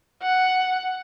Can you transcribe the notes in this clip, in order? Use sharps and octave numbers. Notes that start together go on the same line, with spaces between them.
F#5